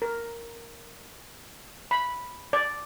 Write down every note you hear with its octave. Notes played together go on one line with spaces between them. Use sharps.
A#4
B5
D5